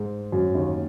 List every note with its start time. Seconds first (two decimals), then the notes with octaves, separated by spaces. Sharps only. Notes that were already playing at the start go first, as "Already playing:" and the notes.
Already playing: G#2 G#3
0.32 F#2 F#3
0.55 D#2 D#3